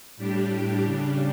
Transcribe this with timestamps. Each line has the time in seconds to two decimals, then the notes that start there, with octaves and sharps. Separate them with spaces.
0.17 A2 G3 D4 G4
0.84 C#3 G3 D4